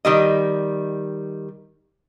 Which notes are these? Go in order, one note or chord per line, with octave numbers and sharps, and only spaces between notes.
D#3 G3 D#5